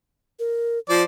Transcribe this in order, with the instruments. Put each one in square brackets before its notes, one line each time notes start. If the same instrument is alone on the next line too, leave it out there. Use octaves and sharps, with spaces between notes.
[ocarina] A#4
[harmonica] F3 C5 D5 [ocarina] F4